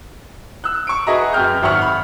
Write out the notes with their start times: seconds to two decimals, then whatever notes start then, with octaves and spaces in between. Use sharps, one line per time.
0.64 E6 F#6
0.87 C#6 D7
1.07 F#4 G#4 B4 D#5 E5 A#5
1.33 F#2 G5 F6 G6
1.63 G#1 E5 F#5 C#6 F6
1.82 B5